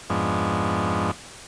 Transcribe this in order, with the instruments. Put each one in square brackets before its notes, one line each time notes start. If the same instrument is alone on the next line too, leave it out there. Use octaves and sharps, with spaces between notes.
[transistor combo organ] F2 G#2 F3 G#3 B3 D4